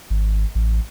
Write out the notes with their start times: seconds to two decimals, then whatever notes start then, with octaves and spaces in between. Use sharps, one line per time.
0.10 G#1
0.55 A1